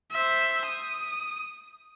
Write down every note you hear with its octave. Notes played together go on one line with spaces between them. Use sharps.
C5 E5
D#6